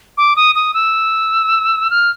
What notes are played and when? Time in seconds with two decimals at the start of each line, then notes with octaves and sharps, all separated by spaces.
0.18 D6
0.36 D#6
0.55 D#6
0.74 E6
1.90 F6